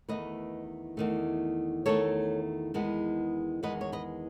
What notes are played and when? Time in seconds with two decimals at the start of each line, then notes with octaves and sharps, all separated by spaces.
0.09 E2 D#3 A3 B4 D#5
0.97 E2 D#3 A3
1.85 E2 D#3 A3 A4 C#5
2.74 E2 D#3 G#3 B3
3.63 E2 D#3 G#3 B3 B4 D#5
3.81 C#5
3.92 B4 D#5